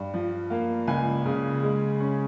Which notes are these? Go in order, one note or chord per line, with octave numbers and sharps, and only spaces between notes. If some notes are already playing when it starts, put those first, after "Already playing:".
Already playing: G2
F3
A#3 F5
C#2 G#5
C#3
G#3
C#4